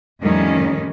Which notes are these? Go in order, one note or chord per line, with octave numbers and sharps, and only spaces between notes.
F2 A2 D#3 G3 C#4